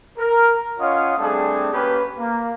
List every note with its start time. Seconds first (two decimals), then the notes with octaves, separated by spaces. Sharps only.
0.17 A#4
0.79 C#4 F4 C#5 D#5 F5 F#5
1.18 G3 A3 C4 D4 G#4 A4
1.72 A#3 C#4 G4 B4
2.18 A#3